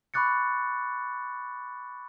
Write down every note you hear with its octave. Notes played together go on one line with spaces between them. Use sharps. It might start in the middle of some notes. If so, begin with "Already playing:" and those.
B5 C#6 D6 F#6 A6 C#7